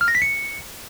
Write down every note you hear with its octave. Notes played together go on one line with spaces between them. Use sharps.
F6
A#6
B6
C#7